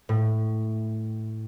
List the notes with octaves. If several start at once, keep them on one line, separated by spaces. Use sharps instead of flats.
A2